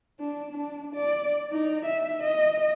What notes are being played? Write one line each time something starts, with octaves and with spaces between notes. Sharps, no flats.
D4
D4
D5
D#4
E5
D#5